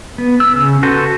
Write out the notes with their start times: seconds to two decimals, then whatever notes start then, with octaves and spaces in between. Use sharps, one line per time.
0.18 B3
0.40 E6
0.54 C#3
0.83 F#4 A4 B4 C5